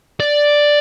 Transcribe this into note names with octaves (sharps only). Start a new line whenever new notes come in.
D5